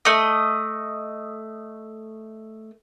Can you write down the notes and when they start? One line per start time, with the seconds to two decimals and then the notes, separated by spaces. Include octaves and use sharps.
0.05 A3 D#5